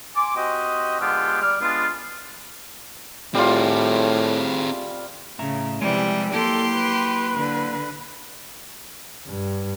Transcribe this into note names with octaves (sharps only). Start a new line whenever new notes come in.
G#5 C6 D6
C4 F#4 G4 D#5
D3 G#3 B3 F4 G4
G3 D5 F6
G#3 B3 D4 F4
A2 G3 C4 F4 G#4
A2 C#3 E5 A#5
C3 E3 F3 G3 G#3
F#3 A#3 E4 G4 A4 C6
B4
D3
G2